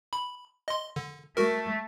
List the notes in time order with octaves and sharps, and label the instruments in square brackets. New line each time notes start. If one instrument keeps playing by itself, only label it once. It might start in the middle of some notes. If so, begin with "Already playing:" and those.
[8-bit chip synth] B5
D#5 C6
D3
[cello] A3 [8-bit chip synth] F#4 A#4